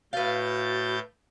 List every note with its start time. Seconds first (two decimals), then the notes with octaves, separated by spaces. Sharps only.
0.13 A2 F#4 B4 F5 G6 A6